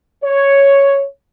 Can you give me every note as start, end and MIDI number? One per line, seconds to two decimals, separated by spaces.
0.24 1.03 73